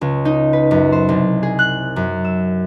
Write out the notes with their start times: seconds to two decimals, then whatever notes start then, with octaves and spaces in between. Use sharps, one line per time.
0.01 C#2
0.25 D#4
0.53 B4
0.71 F#2
0.92 C5
1.09 C2
1.43 G#4
1.59 F#6
1.96 F#2
2.25 E6